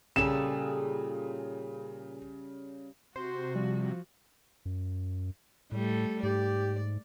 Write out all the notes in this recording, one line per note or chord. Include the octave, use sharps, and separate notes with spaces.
A#2 C#3 G3 G#4 A4 E7
C3 F#4 C5
F3 G3 C4
F#2
A2 G3 A3 A4
G#2 G4 D5